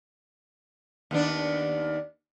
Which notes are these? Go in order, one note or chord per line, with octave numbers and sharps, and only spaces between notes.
D#2 B3 D4